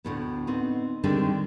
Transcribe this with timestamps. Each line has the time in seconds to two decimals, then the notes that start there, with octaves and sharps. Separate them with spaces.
0.04 D2 A2 B3
0.47 B3 C4 D#4
1.04 D3 D#3 G3 G#3 C4 D4